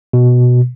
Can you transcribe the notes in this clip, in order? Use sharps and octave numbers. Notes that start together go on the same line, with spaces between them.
B2